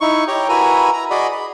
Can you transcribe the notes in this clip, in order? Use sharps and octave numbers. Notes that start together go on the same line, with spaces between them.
D#4 E4 C#6
G4 C#5 G5 A#5
E4 F#4 A#4 B4 G#5 A#5
A#5
F#4 G#4 D5 D#5 B5
B5